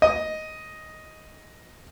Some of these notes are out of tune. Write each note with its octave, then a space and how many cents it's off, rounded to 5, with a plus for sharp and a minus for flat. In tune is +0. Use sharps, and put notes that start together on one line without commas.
D#5 +5